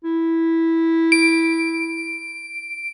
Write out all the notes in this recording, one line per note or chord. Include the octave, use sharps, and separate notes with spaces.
E4
D7